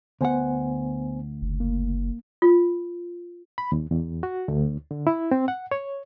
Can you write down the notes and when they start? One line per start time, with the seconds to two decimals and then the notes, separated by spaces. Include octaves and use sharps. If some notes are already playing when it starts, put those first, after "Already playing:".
0.21 D2 B3 C5 F#5 G#5
1.42 F#1
1.60 A#3
2.42 F4
3.58 B5
3.72 D#2
3.91 E2
4.23 F#4
4.48 D2
4.91 D3
5.07 E4
5.31 C4
5.48 F#5
5.71 C#5